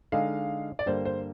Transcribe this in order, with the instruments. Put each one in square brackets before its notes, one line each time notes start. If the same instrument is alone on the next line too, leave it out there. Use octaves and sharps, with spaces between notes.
[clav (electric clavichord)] D3 G#3 D#4 G#4 [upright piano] F5
[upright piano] D5
[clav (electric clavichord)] G2 D3 G3 A#3 [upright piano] C5
[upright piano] C5